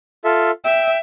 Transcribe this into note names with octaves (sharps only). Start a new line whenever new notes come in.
F4 A4 E5
E5 G5